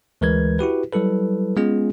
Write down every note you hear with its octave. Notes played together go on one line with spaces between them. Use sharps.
D2 E3 G#3 A#4 B4 G#6
E4 F#4 G4 B4
F#3 G3 E4 A4 B4
G#3 B3 C#4 F4 G#4